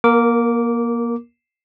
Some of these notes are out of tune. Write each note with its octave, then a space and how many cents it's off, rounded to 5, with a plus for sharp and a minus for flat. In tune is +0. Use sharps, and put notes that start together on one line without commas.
A#3 +30 A#4 -5 D6 -15